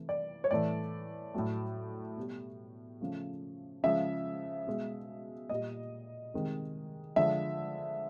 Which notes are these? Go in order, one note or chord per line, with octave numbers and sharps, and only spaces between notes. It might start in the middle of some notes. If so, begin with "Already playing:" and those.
Already playing: C3 E3 A3
D5
C#5
A2 E3 A3 D5
A2 F#3 A3
B2 G3
C#3 F3 A3
C#3 F3 G#3 E5
B2 G#3
A#2 G3 D#5
C3 D#3 G#3
D3 F3 G#3 E5